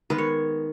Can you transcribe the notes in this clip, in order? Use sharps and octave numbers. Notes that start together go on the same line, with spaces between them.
D#3 G#3 B3 B4
C#5